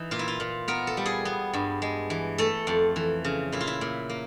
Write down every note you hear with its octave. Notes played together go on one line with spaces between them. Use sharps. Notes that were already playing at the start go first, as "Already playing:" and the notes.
Already playing: E3 D#4
A#2 F4
E4
F4
A#2
B3 A#4
A4
G3
G#4
B3
G2
G#3
E3
A3 A4
F2
E3
C#3
A#2 E4
F4
E4
A#2
A#3